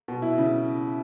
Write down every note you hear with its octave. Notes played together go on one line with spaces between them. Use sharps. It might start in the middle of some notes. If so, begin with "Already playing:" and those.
B2
E4
C#3